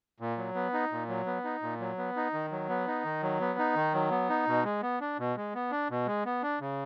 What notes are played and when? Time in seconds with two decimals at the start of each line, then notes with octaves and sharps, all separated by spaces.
0.20 A#2
0.38 F#3
0.55 B3
0.74 D#4
0.92 A#2
1.09 F#3
1.26 B3
1.44 D#4
1.62 A#2
1.80 F#3
1.98 B3
2.16 D#4
2.33 D#3
2.52 F#3
2.69 B3
2.88 D#4
3.05 D#3
3.22 F#3
3.41 B3
3.59 D#4
3.76 D#3
3.94 F#3
4.11 B3
4.30 D#4
4.47 B2
4.64 G#3
4.82 B3
5.01 D4
5.19 B2
5.37 G#3
5.55 B3
5.71 D4
5.90 B2
6.07 G#3
6.26 B3
6.43 D4
6.60 C#3